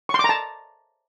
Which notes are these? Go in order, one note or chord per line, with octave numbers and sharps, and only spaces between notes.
C#6
C6
D6
A#5
A5